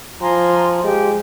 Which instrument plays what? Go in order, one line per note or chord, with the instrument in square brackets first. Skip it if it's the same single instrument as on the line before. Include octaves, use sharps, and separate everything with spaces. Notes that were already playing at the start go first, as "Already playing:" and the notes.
[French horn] F3 [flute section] G#5 A#5 C6
[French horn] G#3 [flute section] G4 G5